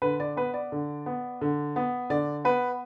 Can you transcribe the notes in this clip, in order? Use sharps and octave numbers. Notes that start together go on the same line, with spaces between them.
D3 B4
D5
B3 B4
D5
D3
B3
D3
B3
D3 D5
B3 B4